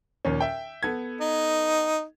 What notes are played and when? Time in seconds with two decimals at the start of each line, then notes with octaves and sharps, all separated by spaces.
0.25 D#2 A#2 C#4
0.40 E5 G5
0.83 B3 A4 G#6
1.21 D#4